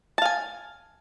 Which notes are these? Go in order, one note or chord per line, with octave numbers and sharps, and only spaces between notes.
F5 G#5 A5